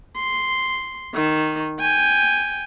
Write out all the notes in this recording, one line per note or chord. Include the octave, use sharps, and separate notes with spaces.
C6
D#3
G5 G#5